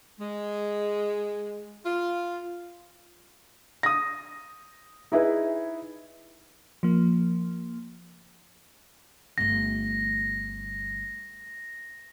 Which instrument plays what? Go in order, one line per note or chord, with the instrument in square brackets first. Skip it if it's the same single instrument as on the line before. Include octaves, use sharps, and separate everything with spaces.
[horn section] G#3
F4
[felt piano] D#6 A#6
D#4 E4 G#4 B4
[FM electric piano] F3 A#3
[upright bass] G1 A3 [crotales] A#6